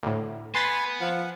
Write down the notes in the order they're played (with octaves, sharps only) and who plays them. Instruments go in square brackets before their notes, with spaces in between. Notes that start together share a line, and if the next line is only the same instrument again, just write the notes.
[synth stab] D2 A2
[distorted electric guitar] B3 [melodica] B4 G#5 [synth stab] C6 A6 B6
[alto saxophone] F3 [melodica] F#5